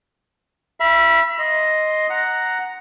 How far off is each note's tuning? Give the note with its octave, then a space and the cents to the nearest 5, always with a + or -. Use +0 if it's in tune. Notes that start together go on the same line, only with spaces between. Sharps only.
E5 +30 B5 -25
D#5 +0 C6 +0
F#5 +0 A#5 +0